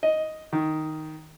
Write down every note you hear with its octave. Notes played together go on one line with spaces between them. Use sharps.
D#5
D#3